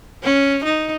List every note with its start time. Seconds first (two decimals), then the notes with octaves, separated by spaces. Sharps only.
0.23 C#4
0.65 D#4